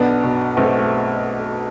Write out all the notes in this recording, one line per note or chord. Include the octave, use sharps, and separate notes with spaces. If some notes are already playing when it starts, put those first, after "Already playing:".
Already playing: B1 B3 D4
B2
B1 A3 C4
A3